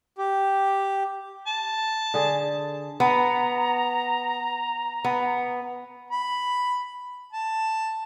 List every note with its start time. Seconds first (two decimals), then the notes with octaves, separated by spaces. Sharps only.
0.18 G4
1.47 A5
2.14 D3 G#4
3.00 B3 A#5
5.05 B3
6.11 B5
7.32 A5